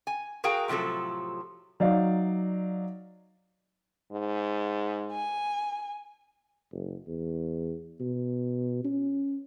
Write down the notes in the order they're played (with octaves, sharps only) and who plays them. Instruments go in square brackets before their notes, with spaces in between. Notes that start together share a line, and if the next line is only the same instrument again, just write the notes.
[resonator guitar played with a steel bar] G#5
F#4 G#4 A#4 F5 G5 A#5
A2 C3 F3 F#3 A4
[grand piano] F#3 D#4 D5 F5
[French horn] G#2
[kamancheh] G#5
[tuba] F#1
E2
B2
C#4